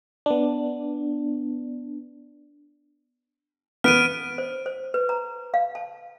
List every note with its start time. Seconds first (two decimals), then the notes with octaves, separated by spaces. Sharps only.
0.26 B3 D4
3.84 B3 F6 D7 D#7
4.38 C5
4.66 C5
4.94 B4
5.09 A#5
5.54 F5
5.75 A5